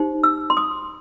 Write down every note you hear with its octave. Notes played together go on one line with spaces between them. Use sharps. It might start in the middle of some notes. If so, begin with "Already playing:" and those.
Already playing: D#4 G4 C5
E6
C6
D#6